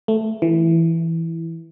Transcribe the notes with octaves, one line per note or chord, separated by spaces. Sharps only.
A3
E3